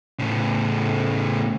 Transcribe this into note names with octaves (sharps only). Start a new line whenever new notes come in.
A2 C#3